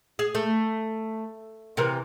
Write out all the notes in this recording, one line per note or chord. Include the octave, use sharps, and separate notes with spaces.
G#4
A3
C3 E3 A#4